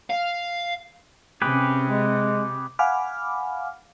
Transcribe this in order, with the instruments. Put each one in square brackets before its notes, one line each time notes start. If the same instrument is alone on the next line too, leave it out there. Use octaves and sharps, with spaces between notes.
[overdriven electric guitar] F5
[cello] C3 [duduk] C#4 [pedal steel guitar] G4 G#4 B4
[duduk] G#3
[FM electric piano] F5 F#5 G#5 B5 D6 F6